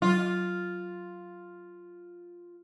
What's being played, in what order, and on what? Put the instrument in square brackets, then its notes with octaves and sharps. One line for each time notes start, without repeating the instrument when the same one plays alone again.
[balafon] F#3 [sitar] F4